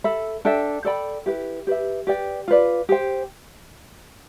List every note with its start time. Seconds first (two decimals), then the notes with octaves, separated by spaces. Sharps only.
0.04 A4 E5 B5
0.45 D4 A4 E5 G5
0.85 A4 D5 G5 B5
1.26 E4 G4 B4
1.67 G4 B4 E5
2.07 G4 B4 D5 G5
2.48 F4 B4 D5
2.89 G4 C5 G5